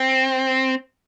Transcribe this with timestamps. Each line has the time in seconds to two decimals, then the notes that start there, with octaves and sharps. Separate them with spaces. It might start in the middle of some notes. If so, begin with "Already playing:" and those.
Already playing: C4